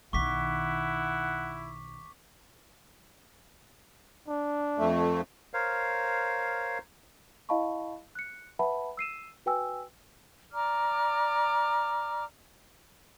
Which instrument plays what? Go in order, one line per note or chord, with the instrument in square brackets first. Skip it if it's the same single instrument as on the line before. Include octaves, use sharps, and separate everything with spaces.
[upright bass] B1 D#3 [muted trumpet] E4 [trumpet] F#5 [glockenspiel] C#6 D6 B6
[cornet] D4
[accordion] F2 A3
[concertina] A#4 C5 C#5 F5
[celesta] E4 D#5 F5 A5 B5 C#6
F#6 C#7
B4 E5 F#5 A5 B5
E6 C7 D#7 E7
F#4 B4 G5 G#5 E6
[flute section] D5 A#5 D6 F6